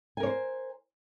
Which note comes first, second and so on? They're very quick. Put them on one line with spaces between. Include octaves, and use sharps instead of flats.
G#5 A#4 C#5 C5